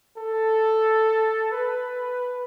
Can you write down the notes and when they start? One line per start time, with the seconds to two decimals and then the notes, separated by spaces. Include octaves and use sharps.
0.17 A4
1.52 B4